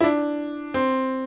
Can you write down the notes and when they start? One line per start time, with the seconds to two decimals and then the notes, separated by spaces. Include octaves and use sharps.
0.01 E4
0.04 D4
0.74 C4